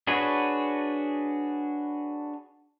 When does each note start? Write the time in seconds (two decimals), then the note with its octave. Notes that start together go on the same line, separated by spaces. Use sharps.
0.07 D4 F#4 G#4 B4 C#5